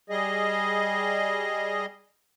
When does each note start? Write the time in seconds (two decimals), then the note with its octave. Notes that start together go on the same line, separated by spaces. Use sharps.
0.10 G3 G#4 D#5